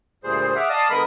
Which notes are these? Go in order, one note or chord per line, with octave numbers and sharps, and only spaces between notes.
D2 A#2 G3 G#4 C5
G#4 E5 F#5 D6 F6
D5 D#5 F5 A5 D#6
D3 G#3 B3 A#4 B5 D#6